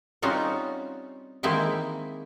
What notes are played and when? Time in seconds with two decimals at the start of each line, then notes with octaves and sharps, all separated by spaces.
0.22 G3 C4 C#4 D#4 F4 F#4
1.43 D#3 E3 G#3 A#3 C4 E4